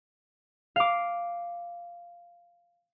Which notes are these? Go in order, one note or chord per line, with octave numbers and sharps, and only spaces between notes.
F5 D6